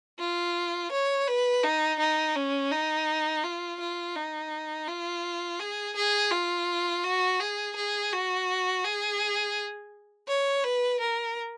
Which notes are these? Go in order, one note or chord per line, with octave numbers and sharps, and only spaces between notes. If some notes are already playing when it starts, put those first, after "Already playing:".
F4
C#5
B4
D#4
D#4
C#4
D#4
F4
F4
D#4
F4
G#4
G#4
F4
F#4
G#4
G#4
F#4
G#4
C#5
B4
A#4